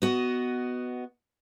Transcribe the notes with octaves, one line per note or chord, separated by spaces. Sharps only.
B3 F#4 D#5